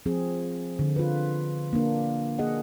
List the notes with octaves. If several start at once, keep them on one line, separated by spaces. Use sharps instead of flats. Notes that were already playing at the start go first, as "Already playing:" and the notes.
F3 C4 G#4
D3
F4 B4
A#3 D4
A#3 G#4 D#5 F#5